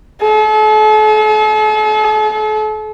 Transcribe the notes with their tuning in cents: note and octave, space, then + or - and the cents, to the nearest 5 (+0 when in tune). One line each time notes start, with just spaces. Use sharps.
A4 -40